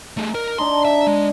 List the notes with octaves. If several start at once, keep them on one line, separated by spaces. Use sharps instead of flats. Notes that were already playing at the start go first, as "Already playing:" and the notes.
A3 D#4 G#4
A#4
D4 D#4 A#5 C6
E5
G#3